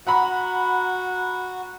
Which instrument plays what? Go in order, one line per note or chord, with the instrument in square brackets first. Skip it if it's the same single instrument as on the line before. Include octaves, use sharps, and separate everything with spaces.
[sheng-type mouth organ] F#4 [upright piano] F#5 A#5 B5